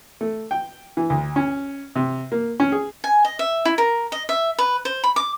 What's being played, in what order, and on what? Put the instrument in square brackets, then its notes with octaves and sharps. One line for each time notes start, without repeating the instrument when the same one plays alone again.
[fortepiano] A3
G5
E3
D2
C#4
C3
A#3
C#4
G#4
[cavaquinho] G#5
D#5
E5
E4
A#4
D#5
E5
B4
C5
B5
D6